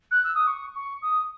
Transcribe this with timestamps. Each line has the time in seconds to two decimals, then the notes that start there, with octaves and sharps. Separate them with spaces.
0.11 F#6
0.24 E6
0.35 D#6
0.47 C#6
0.75 C#6
1.02 D#6